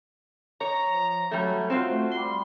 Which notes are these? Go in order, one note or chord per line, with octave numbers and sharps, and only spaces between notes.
C#5 A#5
F3
F#3 G3 A3 C#4
C4 F4 F#4 C5
A3
G3 C6